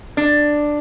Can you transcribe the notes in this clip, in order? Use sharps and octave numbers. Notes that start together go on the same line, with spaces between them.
D4